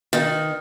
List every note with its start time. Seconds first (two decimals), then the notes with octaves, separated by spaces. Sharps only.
0.13 D#3